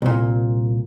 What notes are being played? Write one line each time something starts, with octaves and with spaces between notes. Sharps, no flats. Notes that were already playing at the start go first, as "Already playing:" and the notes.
C2 A#2